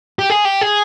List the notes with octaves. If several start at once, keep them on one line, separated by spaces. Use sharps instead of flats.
G4
G#4
G4
G#4